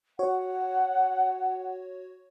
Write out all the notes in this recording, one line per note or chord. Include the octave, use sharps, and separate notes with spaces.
F#4 C#5 F#5